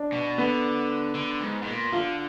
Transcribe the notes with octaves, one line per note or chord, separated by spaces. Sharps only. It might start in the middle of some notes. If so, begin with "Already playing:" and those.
Already playing: D4
B2
D3 B3
D3
G#2
G#2
A#2
D3 F4